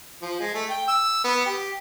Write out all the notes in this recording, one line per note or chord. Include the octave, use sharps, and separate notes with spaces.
F3
G#3
A3
G5
E6
B3
G4